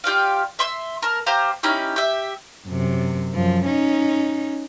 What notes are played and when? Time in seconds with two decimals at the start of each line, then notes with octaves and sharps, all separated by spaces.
0.04 F4 G4 D5 F5
0.59 E5 C6 E6
1.02 A#4 A5
1.26 G4 C5 F5 A#5
1.63 C#4 D#4 E4 G4
1.96 G4 E5
2.67 F#2 C3
3.33 F#2 F3
3.66 C#4 D#4